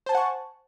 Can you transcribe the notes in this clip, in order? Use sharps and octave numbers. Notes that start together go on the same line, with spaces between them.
C5 F#5 G#5 A5 C#6